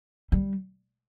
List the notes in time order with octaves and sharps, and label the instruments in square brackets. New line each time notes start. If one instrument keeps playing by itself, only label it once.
[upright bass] G3